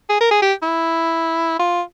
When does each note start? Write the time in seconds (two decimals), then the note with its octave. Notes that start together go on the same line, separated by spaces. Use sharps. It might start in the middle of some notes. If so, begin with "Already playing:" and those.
0.10 G#4
0.20 A#4
0.31 G#4
0.42 G4
0.63 E4
1.59 F4